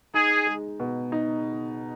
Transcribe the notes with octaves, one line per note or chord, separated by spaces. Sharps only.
D#4 G#4
G#3
B2
D#4